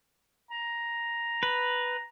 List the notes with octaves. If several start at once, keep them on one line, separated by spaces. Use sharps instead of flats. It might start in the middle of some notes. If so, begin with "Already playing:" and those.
A#5
B4